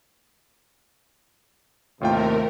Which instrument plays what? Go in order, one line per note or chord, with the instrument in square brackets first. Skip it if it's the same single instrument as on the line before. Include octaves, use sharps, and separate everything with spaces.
[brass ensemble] D#2 C3 [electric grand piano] A2 F4 G5 [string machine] A3 A#4